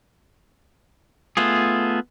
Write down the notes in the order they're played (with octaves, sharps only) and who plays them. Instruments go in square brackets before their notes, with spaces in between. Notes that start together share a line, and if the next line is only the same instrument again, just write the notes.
[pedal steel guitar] A3 B3 F4 G#4